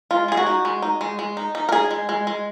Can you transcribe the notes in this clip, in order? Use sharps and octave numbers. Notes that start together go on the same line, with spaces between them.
G#3 F4
G#3 G#4
F#4
D#4
G#3
D#4
G#3
G#3
D#4
D#4
A#4
D#4 G#4
G#3
G#3
G#3